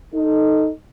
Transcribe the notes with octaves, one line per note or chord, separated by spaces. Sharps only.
D#4 A4